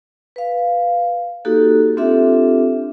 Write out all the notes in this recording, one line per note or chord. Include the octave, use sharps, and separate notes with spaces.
B4 F5
A#3 D#4 F#4 G4 A4
C4 D4 F4 G4 A4 E5